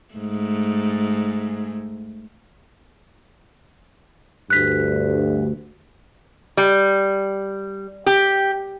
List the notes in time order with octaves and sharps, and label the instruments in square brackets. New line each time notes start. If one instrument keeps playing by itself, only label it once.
[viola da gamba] G#2 A3
[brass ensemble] D2 G2 [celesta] F#6 B6
[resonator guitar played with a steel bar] G3
G4